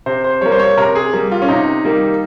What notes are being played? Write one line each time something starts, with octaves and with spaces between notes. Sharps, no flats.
C3 C5
C5
G3 A#3 C#5
C5
C#5
C3 A#4
G#4
G3 A#3
F4
C#4
C3 D#4
D#3 G3 A#3